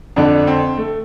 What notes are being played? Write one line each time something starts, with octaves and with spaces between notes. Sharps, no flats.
F2 D3 D4
C4
A3